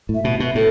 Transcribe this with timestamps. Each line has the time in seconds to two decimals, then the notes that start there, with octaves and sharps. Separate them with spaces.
0.09 A2
0.15 E5
0.24 B2
0.40 B2
0.55 A2 A4